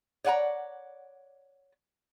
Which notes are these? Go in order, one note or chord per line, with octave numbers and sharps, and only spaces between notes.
C#5 D5 F#5 G#5 A#5